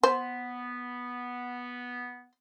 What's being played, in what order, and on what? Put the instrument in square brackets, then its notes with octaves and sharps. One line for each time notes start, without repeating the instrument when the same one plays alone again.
[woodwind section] B3 [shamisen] C5